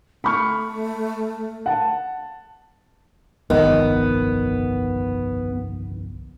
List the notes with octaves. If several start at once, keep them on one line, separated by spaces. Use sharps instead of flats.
A3 B5 C#6 F6
F#5 A5
G1 C2 F2 D#3 B3